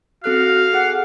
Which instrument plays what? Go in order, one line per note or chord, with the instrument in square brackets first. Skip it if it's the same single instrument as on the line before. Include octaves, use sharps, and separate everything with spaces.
[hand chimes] C4 A4 F#6 [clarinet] F#4 [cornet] F5
[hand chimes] G#4 [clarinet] F#5